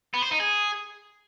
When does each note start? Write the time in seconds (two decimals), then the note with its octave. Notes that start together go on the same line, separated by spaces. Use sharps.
0.14 B3
0.22 C5
0.31 D#4
0.40 G#4